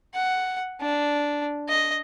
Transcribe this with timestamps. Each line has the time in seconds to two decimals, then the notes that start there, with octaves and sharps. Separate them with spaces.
0.14 F#5
0.81 D4
1.69 D#5